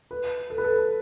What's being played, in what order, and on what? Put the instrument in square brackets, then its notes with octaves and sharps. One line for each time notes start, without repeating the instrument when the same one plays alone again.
[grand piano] B4
A4
B4
A4